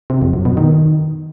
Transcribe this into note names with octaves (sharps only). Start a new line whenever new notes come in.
C3
F2
F#2
B2
D#3